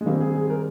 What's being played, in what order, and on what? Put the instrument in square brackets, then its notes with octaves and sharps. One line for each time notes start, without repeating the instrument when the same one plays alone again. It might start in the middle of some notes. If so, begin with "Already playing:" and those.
[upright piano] G#3
[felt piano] D#3 G3 C4 [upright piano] A#3
[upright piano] G#4
G#4
A#4